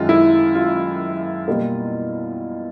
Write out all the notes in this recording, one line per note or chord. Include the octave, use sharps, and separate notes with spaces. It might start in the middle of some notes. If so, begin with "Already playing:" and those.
Already playing: F#2 D#3 G#3 F4
E4
F4
B2 G3 A#3